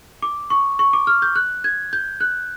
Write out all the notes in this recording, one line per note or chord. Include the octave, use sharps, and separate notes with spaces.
D6
C#6
C#6
D6
F6
G6
F#6
G#6
G6
F#6